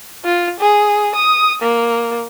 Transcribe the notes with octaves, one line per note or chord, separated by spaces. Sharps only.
F4
G#4
D#6
A#3